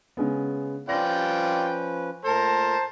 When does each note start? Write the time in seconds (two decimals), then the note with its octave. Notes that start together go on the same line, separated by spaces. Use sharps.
0.17 C#3 G#3 B3
0.89 F3 C#4 F4 B4 D5 G5 A#6
2.25 A#2 A3 A#4 C5 A5